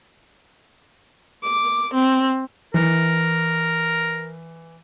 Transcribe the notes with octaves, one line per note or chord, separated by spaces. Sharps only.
D6
C4
E3 A#4